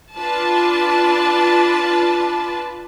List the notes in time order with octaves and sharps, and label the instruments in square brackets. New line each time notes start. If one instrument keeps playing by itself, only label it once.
[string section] D4 F4 B4 A5